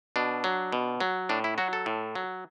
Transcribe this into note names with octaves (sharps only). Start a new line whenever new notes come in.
B2 D4
F#3
B2
F#3
A2 D4
E4
F#3 F#4
A4
A2
F#3